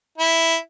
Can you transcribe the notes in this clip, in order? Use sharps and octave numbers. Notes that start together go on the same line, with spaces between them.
E4